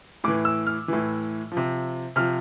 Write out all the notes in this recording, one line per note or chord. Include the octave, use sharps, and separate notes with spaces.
A2 E3 D6
E6
F6
A2 E3
F3
C3
C3 F3 F6